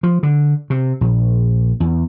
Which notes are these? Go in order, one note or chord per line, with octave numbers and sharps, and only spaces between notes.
F3
D3
C3
A#1
E2